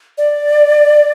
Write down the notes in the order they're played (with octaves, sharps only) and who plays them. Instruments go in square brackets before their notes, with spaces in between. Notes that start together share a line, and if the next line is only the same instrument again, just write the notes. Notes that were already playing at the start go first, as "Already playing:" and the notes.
[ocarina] D5